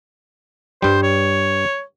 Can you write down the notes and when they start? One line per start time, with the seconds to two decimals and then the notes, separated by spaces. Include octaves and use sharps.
0.82 G2 G3 C5
1.03 C#5